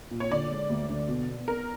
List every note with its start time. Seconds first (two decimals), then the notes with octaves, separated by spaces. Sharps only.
0.11 A#2
0.20 C#5
0.31 D3 D5
0.51 G#3
0.70 D2
0.89 D3
1.08 B2
1.28 B3
1.48 B3 A#4